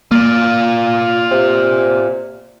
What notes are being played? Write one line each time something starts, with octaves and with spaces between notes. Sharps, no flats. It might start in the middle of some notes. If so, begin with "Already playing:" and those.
A#3 F4 D5
C3